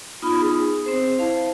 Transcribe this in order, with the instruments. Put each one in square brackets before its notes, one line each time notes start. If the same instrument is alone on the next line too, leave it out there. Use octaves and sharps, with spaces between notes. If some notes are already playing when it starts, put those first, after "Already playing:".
[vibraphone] B3 D#4 F4 [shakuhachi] B5
[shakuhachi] G#4
[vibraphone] C4 C5
[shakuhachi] E4 [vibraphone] C5 F5 A5